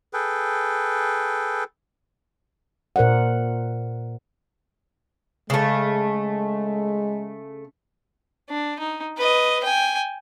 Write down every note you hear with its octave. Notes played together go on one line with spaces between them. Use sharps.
G#4 A4 B4 G5
A#2 A#4 C5 D5 F#5
C#3 G#3 A3
D4
D#4
B4 D#5
G5 G#5